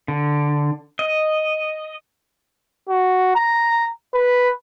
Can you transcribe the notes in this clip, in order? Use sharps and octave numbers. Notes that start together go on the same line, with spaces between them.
D3
D#5
F#4
A#5
B4